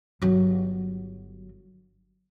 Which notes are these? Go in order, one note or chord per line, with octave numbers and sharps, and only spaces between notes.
G1 F#3